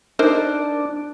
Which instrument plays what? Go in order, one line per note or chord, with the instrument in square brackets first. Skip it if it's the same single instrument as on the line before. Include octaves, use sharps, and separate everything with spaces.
[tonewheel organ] D4 [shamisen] D#4 A#4 C5